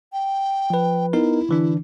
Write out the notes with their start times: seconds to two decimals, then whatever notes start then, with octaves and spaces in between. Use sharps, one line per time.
0.13 G5
0.70 F3 B4
1.13 B3 D#4 E4 A#4
1.49 D3 E3 D4